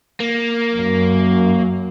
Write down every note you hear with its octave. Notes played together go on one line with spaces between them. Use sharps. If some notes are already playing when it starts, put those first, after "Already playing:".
A#3
F#2